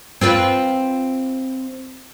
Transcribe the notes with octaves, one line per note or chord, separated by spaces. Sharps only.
C4 F4 B4